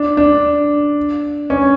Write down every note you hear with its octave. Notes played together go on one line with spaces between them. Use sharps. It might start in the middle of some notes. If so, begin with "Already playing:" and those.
Already playing: D4
D4
C#4